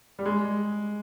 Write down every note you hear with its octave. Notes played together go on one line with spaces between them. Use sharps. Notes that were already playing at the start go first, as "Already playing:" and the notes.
G3
G#3